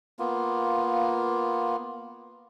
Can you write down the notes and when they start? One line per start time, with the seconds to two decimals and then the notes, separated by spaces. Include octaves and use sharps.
0.19 A#3 B3 F4